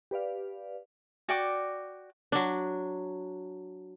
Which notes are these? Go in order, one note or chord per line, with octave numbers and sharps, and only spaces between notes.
G4 B4 D5 F5
F#4 D5 G5 D6
F#3 D4